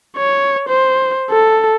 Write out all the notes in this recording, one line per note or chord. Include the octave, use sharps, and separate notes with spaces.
C#5
C5
A4